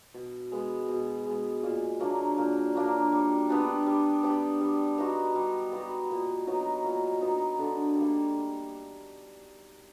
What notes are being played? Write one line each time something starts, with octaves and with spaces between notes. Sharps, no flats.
B2
G#3 B3
B2
G#3 B3
A#2
F#3 A#3 D4
A#2
F#3 A#3 D4
G3
B3 D4 G4
G3
B3 D4 G4
G3
B3 D#4 F#4
G3
B3 D#4 F#4
A#2
F#3 B3 D#4
A#2
F#3 B3 D#4
D3
G3 A#3